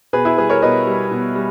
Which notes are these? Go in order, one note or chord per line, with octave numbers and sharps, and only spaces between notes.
B2 G#4 B4
E4 G#4
G3 G#4 B4
A#4 C#5
B2 B4 D#5
G3
B2
G3